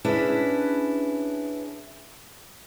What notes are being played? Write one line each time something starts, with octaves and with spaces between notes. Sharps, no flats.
C#4 D4 E4 G#4 B4